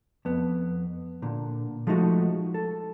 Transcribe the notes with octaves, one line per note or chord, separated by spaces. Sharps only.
F2 B3
A#2 D3
F3 G#3 A3 D#4 F#4 D#5
A4